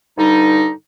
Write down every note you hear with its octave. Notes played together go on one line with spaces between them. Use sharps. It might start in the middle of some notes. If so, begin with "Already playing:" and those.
G2 D3 G3 D#4